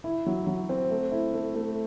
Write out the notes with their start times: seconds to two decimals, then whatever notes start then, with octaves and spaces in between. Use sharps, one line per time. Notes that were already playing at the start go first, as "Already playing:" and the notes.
0.04 E4
0.26 F#3
0.47 F#3
0.69 C4
0.91 A3
1.12 E4
1.34 A3
1.55 A3